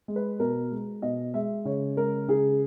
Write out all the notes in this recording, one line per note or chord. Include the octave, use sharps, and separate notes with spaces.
G#3
B4
B2 A#4
G#3
B2 D#5
G#3 E5
C#3 C#5
G#3 A#4
C#3 G#4